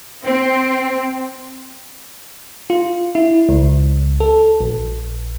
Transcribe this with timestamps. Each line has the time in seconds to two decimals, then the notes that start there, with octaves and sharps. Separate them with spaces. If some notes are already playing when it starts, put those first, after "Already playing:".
0.25 C4
2.70 F4
3.15 E4
3.49 C#2
4.20 A4
4.61 A#1